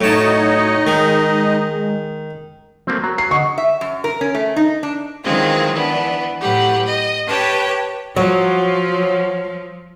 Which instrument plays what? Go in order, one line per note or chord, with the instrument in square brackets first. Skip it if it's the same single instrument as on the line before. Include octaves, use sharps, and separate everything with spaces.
[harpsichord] A2 A5 [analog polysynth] F#3 C#5 C#7 [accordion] D#4 D#5
[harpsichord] D#3 [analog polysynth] G#3
[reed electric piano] F#3 [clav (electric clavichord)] A3 A#3 C4
[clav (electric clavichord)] F#3 [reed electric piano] A#5
[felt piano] C7
[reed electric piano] D3 D#5 F#5 [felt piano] C#6
[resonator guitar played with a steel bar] E5
F#2
A#4
C#4
A3
D#4
D4
[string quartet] D#3 E3 F#3 G#3 C4 F4
E3 B3 D4
A2 F#3 G4 B4 F#5
D#5
G4 B4 C#5 G5 A5
[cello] F3 [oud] F#3 [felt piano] C#5